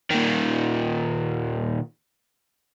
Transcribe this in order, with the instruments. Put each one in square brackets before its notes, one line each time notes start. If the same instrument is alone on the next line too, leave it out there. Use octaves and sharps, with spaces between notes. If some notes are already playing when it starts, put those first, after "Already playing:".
[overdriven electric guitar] A#2 D#3